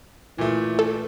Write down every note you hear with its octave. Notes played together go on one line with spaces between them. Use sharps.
A#2 E3 A3
A4